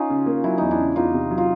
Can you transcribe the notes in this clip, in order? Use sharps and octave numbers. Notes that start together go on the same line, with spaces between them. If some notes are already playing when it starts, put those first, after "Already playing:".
Already playing: C#4 D#4 F4
C#3
A#3
F#3 E4
E2 D#4
D4 E4
C#3
E2 D#4 F4
C3
F#3
F4